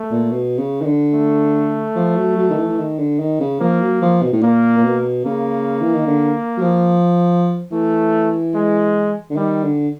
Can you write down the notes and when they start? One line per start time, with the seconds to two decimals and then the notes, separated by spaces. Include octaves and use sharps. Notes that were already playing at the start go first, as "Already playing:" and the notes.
Already playing: A3
0.11 A#2
0.31 B2
0.58 C#3
0.81 D#3
0.86 D3
1.14 A3
1.96 F3
2.17 F#3
2.37 F#3
2.50 D#3
2.57 E3
2.68 E3
2.78 D#3
2.99 D3
3.20 D#3
3.40 C#3
3.60 F3 A#3
3.81 F#3
4.02 F3
4.22 B2
4.32 A2
4.42 A#2 A#3
4.77 A#2
4.84 B2
5.25 C#3 A#3
5.81 E3
5.94 D#3
6.07 D3
6.58 F#3
6.62 F3
7.72 E3 A3
8.54 G#3
9.30 D3
9.36 D#3 G3
9.64 D3